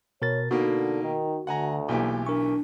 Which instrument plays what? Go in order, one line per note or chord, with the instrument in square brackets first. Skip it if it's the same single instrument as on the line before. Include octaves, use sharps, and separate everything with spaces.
[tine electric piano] B2 A#4 A6 [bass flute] C#5
[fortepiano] B2 A#3 [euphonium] D3 [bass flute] D#4 [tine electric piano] F#4
[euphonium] D#3
[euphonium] D2 [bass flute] D3 [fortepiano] F#5 G#5 A#5
[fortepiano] B1 E3 G4 [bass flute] A#3
[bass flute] D4 [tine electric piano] A#4 C#6